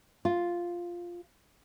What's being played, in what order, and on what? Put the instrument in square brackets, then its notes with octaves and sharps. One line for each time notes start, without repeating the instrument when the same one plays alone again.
[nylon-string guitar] F4